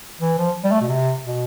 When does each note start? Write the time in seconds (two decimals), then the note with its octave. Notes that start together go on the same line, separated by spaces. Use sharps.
0.21 E3
0.38 F3
0.64 G3
0.72 A3
0.81 B2
0.89 C3
1.24 B2